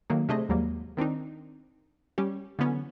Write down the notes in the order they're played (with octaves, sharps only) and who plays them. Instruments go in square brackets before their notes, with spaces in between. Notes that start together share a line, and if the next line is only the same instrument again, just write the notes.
[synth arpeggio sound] D#3 F#3 A3 A#3 D#4
C3 A3 D4 G#4 C5 D#5
D#2 G#2 F#3 G3 A#3
D#3 C4 D4 D#4
G3 C#4 G4
D3 E3 F#3 B3 C#4